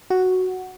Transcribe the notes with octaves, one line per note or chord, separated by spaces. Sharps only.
F#4